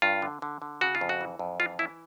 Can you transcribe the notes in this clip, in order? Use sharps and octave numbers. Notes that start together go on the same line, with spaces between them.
G2 F4
D3
D3
D3
C#3 F#4
F4
F2
F#4
E3
F2
E3 F4
E3 E4